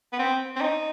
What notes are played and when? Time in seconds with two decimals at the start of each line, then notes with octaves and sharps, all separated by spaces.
0.13 B3
0.19 C4
0.56 C4
0.61 D#4